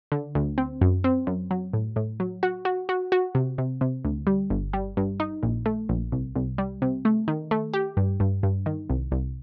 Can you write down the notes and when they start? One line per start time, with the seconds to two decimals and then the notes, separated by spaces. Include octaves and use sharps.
0.12 D3
0.35 D2
0.58 C4
0.81 F#2
1.04 C4
1.27 F#2
1.51 F#3
1.74 A2
1.96 A2
2.20 F#3
2.43 F#4
2.65 F#4
2.89 F#4
3.12 F#4
3.35 C3
3.58 C3
3.81 C3
4.04 D2
4.27 G3
4.50 G1
4.73 G3
4.97 G2
5.20 D#4
5.43 A#1
5.66 A3
5.89 A#1
6.12 C2
6.36 C2
6.58 G3
6.82 C3
7.05 A3
7.28 D#3
7.51 A3
7.73 G4
7.97 G2
8.20 G2
8.43 G2
8.66 D#3
8.90 C2
9.12 C2